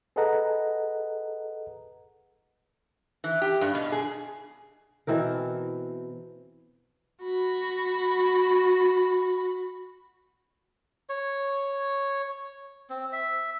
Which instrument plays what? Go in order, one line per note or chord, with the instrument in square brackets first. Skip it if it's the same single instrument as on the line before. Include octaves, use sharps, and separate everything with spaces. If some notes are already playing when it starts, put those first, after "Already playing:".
[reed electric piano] G#4 A4 B4 D#5 F#5 A#5
[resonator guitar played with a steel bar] E3
G4
G2
B2
G#4
[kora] B2 E3 C4 A#4
[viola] F#4 B5
[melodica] C#5
C4
E5